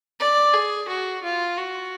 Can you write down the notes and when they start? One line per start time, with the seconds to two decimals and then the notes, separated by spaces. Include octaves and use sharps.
0.19 D5
0.54 G#4
0.88 F#4
1.23 F4
1.57 F#4